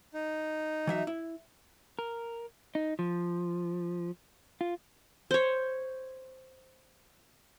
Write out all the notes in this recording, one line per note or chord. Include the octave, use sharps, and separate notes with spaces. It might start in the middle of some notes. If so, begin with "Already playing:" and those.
D#4
E3 F#3 E5
E4
A#4
D#4
F3
F4
C5 C#5